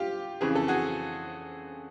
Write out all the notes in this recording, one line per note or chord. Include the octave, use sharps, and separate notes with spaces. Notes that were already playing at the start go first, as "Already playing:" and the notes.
Already playing: F4 G4
F2 C#3 E3 G#4
A4
F#4 G#4